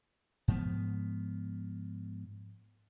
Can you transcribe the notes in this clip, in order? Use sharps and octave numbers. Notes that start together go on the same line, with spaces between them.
G#2 F3 B3